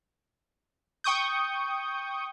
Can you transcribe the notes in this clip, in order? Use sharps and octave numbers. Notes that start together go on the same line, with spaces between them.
G5 C#6 D#6 G6